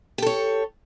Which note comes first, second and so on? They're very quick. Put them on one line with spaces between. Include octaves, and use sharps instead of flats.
G4 A4 C#5